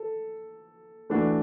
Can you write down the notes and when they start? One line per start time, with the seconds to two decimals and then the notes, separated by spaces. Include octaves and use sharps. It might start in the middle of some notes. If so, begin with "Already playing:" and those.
Already playing: A4
1.10 E3 A3 D4 F#4